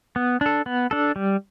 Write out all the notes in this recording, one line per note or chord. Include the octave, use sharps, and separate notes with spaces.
B3
D4 A4
B3
D4 A4
G3